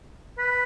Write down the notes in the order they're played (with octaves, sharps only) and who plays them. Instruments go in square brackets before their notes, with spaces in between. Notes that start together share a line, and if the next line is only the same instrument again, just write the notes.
[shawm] B4